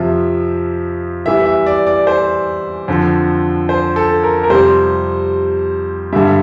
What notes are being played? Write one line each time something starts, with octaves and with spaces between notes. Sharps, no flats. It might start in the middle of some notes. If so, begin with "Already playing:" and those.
Already playing: F2 C3 F3 E5
E2 E3 G3 E5
E5
D5
D5
C5
F2 D3 F3
C5
A4
A#4
A#4
F2 C3 G3 C5
G2 D3 G3 E5